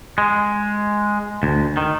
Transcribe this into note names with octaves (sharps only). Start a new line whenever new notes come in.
G#3
D2
D#3